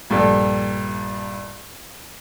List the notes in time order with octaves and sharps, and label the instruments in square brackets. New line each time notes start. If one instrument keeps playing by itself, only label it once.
[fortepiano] A#1 G2 A4